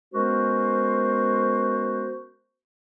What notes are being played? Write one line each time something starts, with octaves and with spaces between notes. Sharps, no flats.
G#3 B3 C#4 F#4 A#4 C5